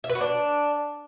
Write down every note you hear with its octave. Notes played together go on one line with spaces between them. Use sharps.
E5
B4
F#4
D4